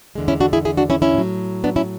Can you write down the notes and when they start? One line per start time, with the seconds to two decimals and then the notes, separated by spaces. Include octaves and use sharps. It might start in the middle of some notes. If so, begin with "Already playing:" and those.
0.15 E2 D3 G#3
0.28 C#4 E4
0.40 D4 F#4
0.53 E4 G#4
0.65 E4 G#4
0.77 D4 F#4
0.90 C#4 E4
1.02 C#4 E4
1.14 A2 F#3
1.64 B3 D4
1.76 C#4 E4